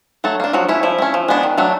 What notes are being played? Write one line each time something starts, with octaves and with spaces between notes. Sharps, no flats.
F#3 A3 A4
A#3 D4
F3 F#3 F#4
A3 C#4 E4
F3 E4
A3 C#4
F3
G#3 B3 D4
D#3
F#3 A3 D4